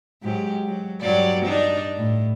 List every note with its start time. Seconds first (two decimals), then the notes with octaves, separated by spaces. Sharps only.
0.23 G#2 F#3 G4
0.68 F#3
1.01 G2 F#3 D5
1.46 D4 D#4
1.97 A2